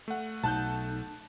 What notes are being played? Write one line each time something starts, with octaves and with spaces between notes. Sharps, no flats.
A3 F#5
B1 D#4 A5 F#6 G6